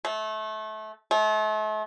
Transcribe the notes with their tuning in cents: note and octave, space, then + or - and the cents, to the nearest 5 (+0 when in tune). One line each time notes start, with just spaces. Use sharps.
A3 -25
A3 -40